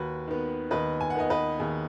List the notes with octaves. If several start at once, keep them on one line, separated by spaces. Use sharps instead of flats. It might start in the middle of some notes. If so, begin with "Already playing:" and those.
Already playing: D#2 F#4 B4
D#3 B3
D#2 B4 D#5
G#5
F#5
D#3 B3 D#5 G#5
B4 D#5
D#2 G#4